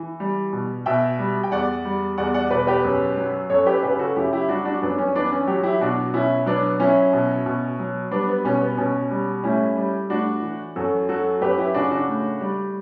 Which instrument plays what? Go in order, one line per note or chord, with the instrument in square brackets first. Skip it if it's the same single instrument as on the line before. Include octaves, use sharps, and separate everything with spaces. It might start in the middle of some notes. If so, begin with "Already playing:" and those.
Already playing: [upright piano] E3
G3
B2
B2 E5 G5
G3
G5
E2 D5 F#5
G3
E2 D5 F#5
D5 F#5
B2 B4 D5
G4 B4
F#2
F#3
F#2 A4 C#5
G4 B4
C#3 G4 B4
F#4 A4
F#2 E4 G4
E4 G4
G3 D4 F#4
D4 F#4
F#2 B3 D4
C#4
E3 B3 D4
C#4
F#3 G4
F#4
E4 G4
B2 D4 F#4
B2 C#4 E4
F#3 B3 D4
F#3 C#4 E4
B2
B2
F#3
G3 B3 D4
B3
B2 C#4
B3
B2 C#4
G3
A2 C#4 E4
G3
A2 D4 F#4
E3
F#2 F#4 A4
F#3 F#4 A4
F#2 G4 B4
E4 G4
C#3 D4 F#4
D4 F#4
A2
G3